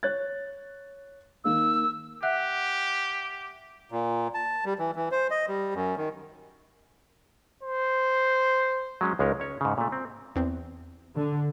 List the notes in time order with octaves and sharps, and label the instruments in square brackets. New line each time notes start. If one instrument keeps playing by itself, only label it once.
[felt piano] C#5 F#6 A6
[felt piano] D#3 A#3 F5 [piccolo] E6
[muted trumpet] G4 [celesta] E5 F#5 F#6
[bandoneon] A#2
A5
G3
E3
E3
C5
D#5
G3
F#2
D#3
[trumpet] C5
[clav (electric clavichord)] F#3 G#3 C#4
C#2 G#3 C#4 D#4 A#4
C#4 C#5
G#2 C#3
A#2 A3
C4
[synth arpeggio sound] E2 C4
[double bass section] D3